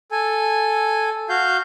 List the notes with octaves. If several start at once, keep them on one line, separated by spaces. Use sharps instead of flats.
A4 G#5
F#4 F5 G6